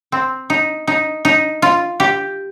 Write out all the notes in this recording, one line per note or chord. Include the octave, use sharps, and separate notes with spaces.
C4
D#4
D#4
D#4
F4
G4